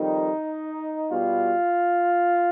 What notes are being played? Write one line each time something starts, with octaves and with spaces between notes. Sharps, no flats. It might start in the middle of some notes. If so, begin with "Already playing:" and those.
Already playing: F2 D#3 G3 D#4
B2 G3 F4